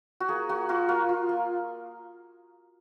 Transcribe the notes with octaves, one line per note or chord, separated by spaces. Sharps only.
F#4
A#3 G#4
A#3 F#4
F4 F#4
A#3 F4
F4
A#3